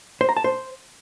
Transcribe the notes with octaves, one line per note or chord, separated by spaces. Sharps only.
C5
A#5
A5
C5